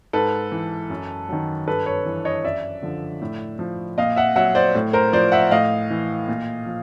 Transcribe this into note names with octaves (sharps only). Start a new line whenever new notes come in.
G#2 A4 B4
E3
F#2
D#3 F#3
G2 A4 B4
B4 C#5
E3
C#5 D#5
F#2 D5 E5
D3 F3
A2
F3
A#2 D#5 F5
E5 F#5
F#3 E5 F#5
C5 D5
A2
A#4 C5
F3 C5 D5
E5 F#5
A2 D#5 F5
E3
A#2
F3